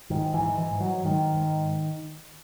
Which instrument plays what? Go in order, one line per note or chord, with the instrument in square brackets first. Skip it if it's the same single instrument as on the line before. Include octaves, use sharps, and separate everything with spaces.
[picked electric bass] G#2 D#3
E3
G#2
E3
G#2
F#3
G#2 D#3
G#2